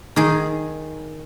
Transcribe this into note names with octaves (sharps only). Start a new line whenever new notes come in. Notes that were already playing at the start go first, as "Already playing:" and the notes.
D#3 G#4